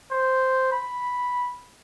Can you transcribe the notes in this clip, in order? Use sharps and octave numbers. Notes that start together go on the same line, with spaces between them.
C5
B5